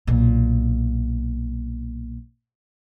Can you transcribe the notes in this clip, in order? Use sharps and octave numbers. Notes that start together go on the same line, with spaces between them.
B1 A#2